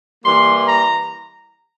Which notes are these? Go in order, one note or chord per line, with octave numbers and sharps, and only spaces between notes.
E3 G3 A#3 C6
A#5